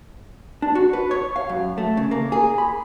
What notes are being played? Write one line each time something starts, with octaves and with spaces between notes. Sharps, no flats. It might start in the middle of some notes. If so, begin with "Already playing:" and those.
D4
F#4
B4
C#5
F5
F#2
A3
C#3
A#3
G#4
B5